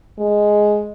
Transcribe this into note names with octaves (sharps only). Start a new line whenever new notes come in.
G#3